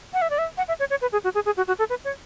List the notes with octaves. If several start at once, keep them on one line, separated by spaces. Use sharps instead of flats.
F#5
E5
D5
E5
F#5
E5
C#5
C#5
B4
G#4
F#4
G#4
G#4
F#4
F#4
A4
B4
C#5